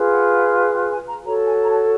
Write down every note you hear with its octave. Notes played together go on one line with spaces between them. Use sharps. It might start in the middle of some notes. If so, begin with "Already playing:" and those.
Already playing: F4 G#4 B4
F#5
F#5
G5
G5
G#5
A#5
F#4 A4 C#5 A#5
G#5
A#5
A5